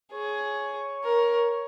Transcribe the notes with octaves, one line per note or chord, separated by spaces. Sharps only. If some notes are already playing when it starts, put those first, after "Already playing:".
G#4 C#5
A#4